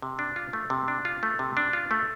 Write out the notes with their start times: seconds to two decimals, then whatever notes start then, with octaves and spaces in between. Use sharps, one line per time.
0.02 C3
0.19 D4
0.36 F4
0.53 A3
0.70 C3
0.88 D4
1.05 F4
1.23 A3
1.39 C3
1.57 D4
1.73 F4
1.91 A3